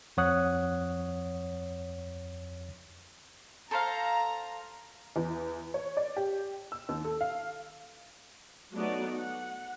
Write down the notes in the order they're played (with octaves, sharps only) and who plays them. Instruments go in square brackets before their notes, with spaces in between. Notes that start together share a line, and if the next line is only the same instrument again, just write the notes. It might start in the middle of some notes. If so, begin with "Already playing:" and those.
[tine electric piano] F2 F3 C#5 F#5 D#6 F#6
[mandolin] A4 C5 F5 [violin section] A#5
[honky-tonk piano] E2
C#5
D5
G4
E6
D#2
A4
F5
[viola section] F#3 A3 B3 D#4 F#4 D5
F#5